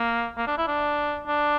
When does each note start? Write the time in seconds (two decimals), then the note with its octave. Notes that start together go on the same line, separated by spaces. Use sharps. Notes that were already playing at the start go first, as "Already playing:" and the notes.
Already playing: A#3
0.37 A#3
0.47 D4
0.57 E4
0.67 D4
1.27 D4